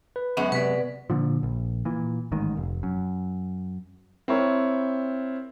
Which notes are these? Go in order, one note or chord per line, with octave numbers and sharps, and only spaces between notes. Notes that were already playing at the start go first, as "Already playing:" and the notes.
B4
F#2 G#3 B3 F#4
C3 B3 B4 D5 B6
A#2 D3 F3
A#1
A#2 E3
A1 G#2 D#3
F1
F#2
C4 E4 A#4 C#5